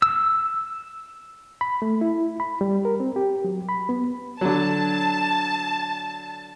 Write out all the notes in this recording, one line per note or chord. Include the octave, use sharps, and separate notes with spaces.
E6
B5
A3
E4
B5
G3
A#4
C4
G4
F#3
B5
B3
D3 F#3 A5